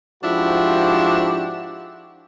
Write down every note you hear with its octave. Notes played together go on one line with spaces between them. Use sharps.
G#2 F3 D4 E4 F#4 G4